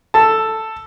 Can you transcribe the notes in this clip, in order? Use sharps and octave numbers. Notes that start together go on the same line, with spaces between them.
A4 A5